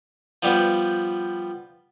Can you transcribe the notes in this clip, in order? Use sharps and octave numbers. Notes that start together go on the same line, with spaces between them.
F3 G3 B3